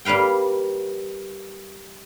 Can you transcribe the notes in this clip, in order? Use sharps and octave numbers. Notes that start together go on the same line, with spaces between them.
G3 A#3 B4 F5 G5